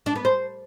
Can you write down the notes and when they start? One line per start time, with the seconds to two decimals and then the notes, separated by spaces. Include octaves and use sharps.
0.06 D4
0.15 B3
0.25 C5